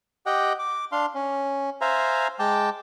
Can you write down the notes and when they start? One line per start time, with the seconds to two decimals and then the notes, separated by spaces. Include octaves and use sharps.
0.26 G4 D#5 F#5 G5
0.59 D6
0.92 D4 F5 C6
1.15 C#4
1.81 C5 E5 F5 G#5 A#5
2.39 G#3 G5 A5 D6